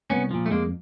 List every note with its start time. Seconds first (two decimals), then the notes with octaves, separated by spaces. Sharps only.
0.10 C2 B3 C#4
0.31 A#2 F3
0.46 A3
0.50 F2 G#3 A#3